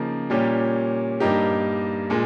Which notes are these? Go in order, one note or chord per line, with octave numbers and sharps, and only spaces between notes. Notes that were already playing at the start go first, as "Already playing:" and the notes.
Already playing: C#3 F3 A#3 D#4
A#2 G3 A#3 C#4 G4
G2 G3 A#3 D#4 G4
A#2 G#3